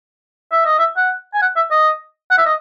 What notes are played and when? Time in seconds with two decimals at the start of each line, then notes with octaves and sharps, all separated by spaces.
0.52 E5
0.65 D#5
0.79 E5
0.97 F#5
1.34 G#5
1.41 F#5
1.56 E5
1.71 D#5
2.30 F#5
2.38 E5
2.46 D#5